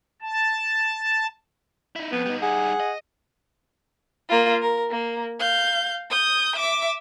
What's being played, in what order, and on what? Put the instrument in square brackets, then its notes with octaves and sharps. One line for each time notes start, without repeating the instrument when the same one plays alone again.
[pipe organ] A5
[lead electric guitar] D#4 E4
[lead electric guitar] F2 [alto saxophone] B3
[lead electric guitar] G3 D#4
[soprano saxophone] G#4 [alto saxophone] F#5
[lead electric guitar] D#5
[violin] A#3 F4
A#4
A#3
F5 G6
D#6 G6
E5 D6